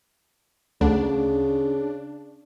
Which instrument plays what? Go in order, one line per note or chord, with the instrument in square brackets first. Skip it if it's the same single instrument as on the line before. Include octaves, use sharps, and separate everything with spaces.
[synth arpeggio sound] D2 [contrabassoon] C#3 [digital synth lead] D4